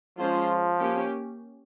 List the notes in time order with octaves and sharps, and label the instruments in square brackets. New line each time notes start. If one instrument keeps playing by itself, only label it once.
[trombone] F3 [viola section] G#3 C#4 F4 C5
[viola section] A#3 C#4 G4